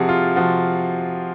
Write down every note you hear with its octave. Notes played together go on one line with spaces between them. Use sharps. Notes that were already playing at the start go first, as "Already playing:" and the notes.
Already playing: C3 F3 F#4 G#4
F4
C3 F3 F#4